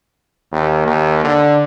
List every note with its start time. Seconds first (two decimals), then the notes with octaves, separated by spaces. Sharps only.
0.52 D#2
0.86 D#2
1.24 D3